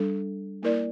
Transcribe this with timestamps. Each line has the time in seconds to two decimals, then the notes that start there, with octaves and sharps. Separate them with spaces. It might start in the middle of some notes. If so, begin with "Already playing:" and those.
Already playing: G3 D4 A4
0.63 A#3 E4 A#4 D5